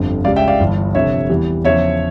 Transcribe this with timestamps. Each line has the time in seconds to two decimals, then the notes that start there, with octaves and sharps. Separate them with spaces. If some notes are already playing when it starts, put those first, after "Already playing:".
Already playing: G1 F2 D3 F3
0.24 C#2 C#3 G3 D5 F5
0.36 E5 G5
0.48 D5 F5
0.60 G1 G2 E3
0.95 F1 F2 D3 C#5 E5
1.29 E2 E3 G3
1.65 E2 C#3 F3 C#5 E5